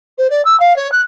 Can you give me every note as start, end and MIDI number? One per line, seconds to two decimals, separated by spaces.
0.18 0.30 72
0.30 0.41 74
0.45 0.58 88
0.60 0.76 77
0.76 0.90 73
0.92 1.01 90